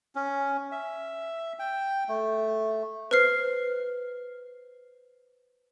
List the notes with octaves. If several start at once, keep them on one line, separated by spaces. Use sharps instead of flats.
C#4
E5
G5
A3
B4 C5 F6 C7